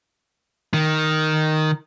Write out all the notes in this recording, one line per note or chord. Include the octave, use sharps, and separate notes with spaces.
D#3